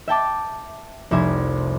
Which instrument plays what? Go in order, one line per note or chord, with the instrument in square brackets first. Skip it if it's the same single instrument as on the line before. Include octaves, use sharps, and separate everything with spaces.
[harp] E5 G5 A5 D6
F1 C2 E5 G#5